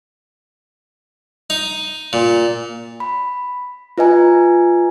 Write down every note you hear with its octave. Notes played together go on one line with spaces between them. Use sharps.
D#4
A#2
B5
F4 B4 D#5 G#5 A#5